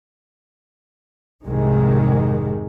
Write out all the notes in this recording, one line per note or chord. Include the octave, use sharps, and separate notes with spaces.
F1 C2 G#2 C3 D#3 G#3